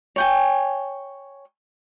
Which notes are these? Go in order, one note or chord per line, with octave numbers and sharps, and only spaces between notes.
C#5 G5 G#5